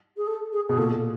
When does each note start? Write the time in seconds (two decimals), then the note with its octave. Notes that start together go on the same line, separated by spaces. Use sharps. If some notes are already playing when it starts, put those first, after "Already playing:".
0.16 G#4
0.26 A4
0.52 G#4
0.68 B2 G#4
0.77 A#2 A4